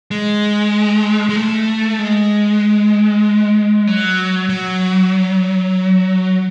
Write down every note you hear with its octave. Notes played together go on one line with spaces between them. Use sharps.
G#3
G#3
A3
G#3
F#3
F#3